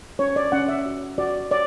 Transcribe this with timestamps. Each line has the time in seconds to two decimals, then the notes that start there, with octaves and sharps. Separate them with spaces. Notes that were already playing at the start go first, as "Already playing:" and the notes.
0.19 C#4 C#5
0.36 D5
0.52 C#4 F#5
0.69 E5
0.86 F#4
1.18 F#4 D5
1.51 C#5 D5